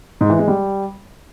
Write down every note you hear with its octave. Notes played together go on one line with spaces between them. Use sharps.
G#2
E3
G#3
G3